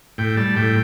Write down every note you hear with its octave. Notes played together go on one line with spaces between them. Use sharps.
A2 G5
G3 A5
A2 G5